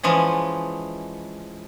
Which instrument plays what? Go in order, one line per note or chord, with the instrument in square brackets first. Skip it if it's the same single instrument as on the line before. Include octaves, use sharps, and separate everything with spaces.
[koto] E3 F3 G#3 C#4